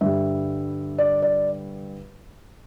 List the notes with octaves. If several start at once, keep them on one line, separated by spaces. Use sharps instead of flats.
G2 D3 G3 E5
D5
D5